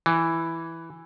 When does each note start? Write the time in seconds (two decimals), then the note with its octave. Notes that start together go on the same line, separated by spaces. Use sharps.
0.06 E3